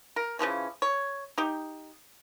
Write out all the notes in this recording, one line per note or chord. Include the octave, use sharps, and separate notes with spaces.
A#4
C#3 E3 F3 C#4
C#5
D#4 G4